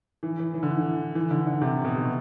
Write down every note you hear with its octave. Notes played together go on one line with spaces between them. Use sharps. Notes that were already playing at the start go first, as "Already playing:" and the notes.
E3
E3
E3
D3
E3
E3
D3
D3
C3
B2
C3